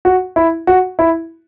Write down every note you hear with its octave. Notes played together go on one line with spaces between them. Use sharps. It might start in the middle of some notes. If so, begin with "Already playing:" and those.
F#4
E4
F#4
E4